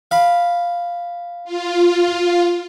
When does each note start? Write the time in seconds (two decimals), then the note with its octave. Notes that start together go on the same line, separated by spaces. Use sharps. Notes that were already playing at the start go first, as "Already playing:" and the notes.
0.11 F5 B5
1.45 F4